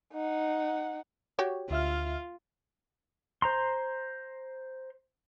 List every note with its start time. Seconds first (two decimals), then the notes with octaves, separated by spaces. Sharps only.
0.14 D#4 F#5
1.39 F#4 G4 C#5
1.70 D2 F4 E5 F6
3.42 C5 A#5 C6